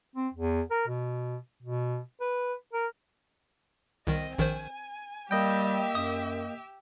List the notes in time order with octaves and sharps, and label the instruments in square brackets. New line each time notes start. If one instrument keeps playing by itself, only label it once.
[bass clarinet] C4
E2
A#4
B2
B2
B4
A#4
[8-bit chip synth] C2 D#3 [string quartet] C4 D#5
[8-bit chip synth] A#1 D#3 C5 [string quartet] G#5
[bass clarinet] G3 [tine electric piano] A#3 D#5 G5 [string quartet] G4 E5
[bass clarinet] F#2 [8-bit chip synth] D#6